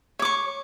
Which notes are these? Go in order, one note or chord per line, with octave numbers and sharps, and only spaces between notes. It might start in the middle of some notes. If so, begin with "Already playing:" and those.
C#5 C#6 D6